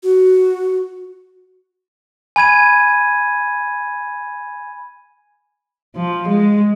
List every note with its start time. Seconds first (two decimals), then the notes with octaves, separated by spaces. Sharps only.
0.03 F#4
2.36 G#5 B5 G#6 D#7
5.96 F3
6.28 G#3